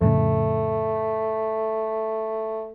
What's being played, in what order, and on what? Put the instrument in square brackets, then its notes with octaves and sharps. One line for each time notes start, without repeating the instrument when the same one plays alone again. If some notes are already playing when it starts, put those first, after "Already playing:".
[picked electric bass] F2 A2 C#3 [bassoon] A3